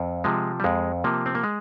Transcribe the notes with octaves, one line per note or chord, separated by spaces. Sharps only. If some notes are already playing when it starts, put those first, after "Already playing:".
Already playing: F2
C3 F3 G#3
G3
F2 G#3
C3 F3 A#3
C4
A#3
G#3